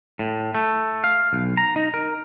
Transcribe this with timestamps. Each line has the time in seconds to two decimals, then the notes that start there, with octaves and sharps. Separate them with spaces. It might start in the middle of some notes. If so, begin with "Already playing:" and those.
0.19 A2
0.55 A3
1.04 F5
1.33 B1
1.57 A#5
1.76 D#4
1.94 A#4